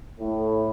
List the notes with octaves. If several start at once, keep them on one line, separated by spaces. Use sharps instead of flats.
A2